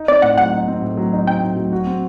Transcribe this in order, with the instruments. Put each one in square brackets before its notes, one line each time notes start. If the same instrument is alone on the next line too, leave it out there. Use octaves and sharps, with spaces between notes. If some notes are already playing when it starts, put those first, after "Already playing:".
Already playing: [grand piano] D#4
[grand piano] C4 [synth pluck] D5
[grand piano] A2 [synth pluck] F#5
[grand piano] F#3 [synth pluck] F#5
[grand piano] D#4
C4
A2
F#3
D#4
[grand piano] C4 [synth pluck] G5
[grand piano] A2
F#3
F#4
C4